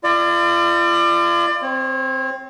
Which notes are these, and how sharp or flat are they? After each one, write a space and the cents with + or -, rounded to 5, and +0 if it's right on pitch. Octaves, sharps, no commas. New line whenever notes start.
F4 -35 D5 +30
C4 +0 C#5 -35